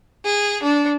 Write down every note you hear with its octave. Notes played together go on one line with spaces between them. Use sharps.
G#4
D4